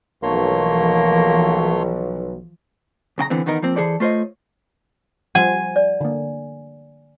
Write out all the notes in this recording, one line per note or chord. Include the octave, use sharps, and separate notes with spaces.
B1 E3 F3 A3 A#3 C#5 C6
B1 C#3 G5 A#5
D3 E3 B3 C4
E2 D#3 B3 D#4 A#4
F3 A#3 C4
E3 G#4 A4 C5 D5
A3 F4 C5 C#5 D#5
F3 G3 C5 F#5 G#5
D5
D3 A#3